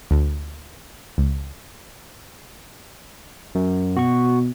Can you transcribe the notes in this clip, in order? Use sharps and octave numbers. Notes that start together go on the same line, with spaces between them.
D2
C#2
F#2
B2 F#4 C#6